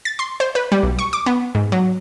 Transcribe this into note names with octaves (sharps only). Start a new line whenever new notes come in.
A6
C6
C5
B4
G3
B1
C#6
D6
B3
G#2
F#3